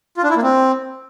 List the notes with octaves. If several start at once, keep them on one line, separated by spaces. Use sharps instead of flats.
F4
D4
E4
A#3
C4